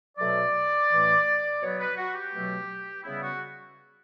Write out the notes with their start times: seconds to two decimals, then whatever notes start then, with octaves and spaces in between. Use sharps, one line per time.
0.17 B2 F#3 A3 D5
0.90 A2 E3 A3
1.61 B2 F#3 B3 C#5
1.78 B4
1.97 F#4
2.15 G4
2.32 B2 F#3 A3
3.04 C#3 G3 B3 E4
3.22 F#4